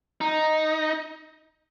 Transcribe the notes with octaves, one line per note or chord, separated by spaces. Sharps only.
D#4